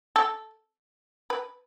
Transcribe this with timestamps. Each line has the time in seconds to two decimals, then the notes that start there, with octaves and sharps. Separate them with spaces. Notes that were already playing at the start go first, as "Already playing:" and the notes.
0.16 A4
1.30 B4